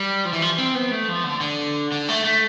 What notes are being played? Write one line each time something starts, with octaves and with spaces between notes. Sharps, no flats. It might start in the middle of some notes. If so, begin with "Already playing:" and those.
Already playing: G3
F3
E3
F3
C4
B3
A3
F3
D3
D3
D3
A3
A3